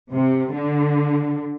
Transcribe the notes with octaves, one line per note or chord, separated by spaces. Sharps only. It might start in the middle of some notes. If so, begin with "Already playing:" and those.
C3
D3